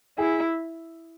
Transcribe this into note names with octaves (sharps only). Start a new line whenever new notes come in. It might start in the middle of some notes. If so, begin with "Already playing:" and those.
E4 G#4